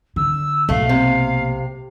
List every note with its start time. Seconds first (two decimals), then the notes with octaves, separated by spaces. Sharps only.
0.16 D3 E6
0.69 B1 A3 A#3 F5
0.89 C3